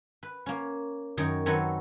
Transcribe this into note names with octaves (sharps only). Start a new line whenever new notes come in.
B4
A#3 C#4
F#2 D#3 D#4 C#5 G5
D#3 F#3 C4 A4 B4 C#5